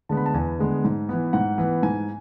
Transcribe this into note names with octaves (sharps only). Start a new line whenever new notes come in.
D3 G#3 B3 A5
B5
A5
E2 G#5
D3 G#3 B3
G#2
E3 B3
G#2 F#5
E3 B3
G#2 G#5